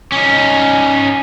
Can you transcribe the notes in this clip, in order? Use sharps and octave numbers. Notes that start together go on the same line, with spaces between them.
C#4 D#4